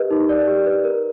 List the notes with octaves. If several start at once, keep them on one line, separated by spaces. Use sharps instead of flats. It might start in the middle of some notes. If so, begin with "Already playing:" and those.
Already playing: G4 A#4 B4 D#5
D#4
D5
G4
B4
A#4